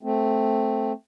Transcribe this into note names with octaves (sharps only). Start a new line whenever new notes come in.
A3 C4